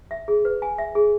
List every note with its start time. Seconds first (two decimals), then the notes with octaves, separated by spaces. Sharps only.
0.11 E5
0.28 G#4
0.45 B4
0.62 G#5
0.78 E5
0.95 G#4